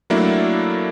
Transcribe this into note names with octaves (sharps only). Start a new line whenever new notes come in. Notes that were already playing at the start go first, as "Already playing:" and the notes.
F#3 A3 A#3 D4 E4